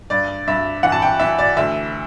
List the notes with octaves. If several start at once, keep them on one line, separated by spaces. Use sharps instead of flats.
G2 D5
G2 E5
E3 F#5
A5
G5
E3 E5
D5
D2 E5